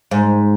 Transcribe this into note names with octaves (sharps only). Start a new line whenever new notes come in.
G#2